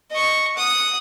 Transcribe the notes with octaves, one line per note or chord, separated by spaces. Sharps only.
D#5 C#6
F#5 D#6